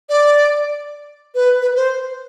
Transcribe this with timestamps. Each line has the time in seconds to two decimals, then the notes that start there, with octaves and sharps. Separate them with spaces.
0.09 D5
1.35 B4
1.62 B4
1.76 C5